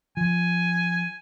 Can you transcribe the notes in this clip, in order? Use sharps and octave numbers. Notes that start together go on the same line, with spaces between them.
F3 G#5